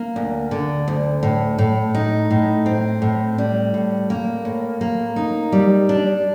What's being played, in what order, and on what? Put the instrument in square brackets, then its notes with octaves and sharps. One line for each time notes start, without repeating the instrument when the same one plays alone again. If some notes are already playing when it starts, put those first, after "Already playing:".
Already playing: [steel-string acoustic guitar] A#3
D2
D3
D2
A2
A2
D#4
A2
C4
A2
G3
A2
A#3
A2
A#3
D#4
G3
D4